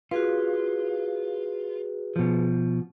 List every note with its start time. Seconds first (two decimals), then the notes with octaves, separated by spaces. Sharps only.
0.11 F4 F#4 G#4 B4
2.16 B2 F3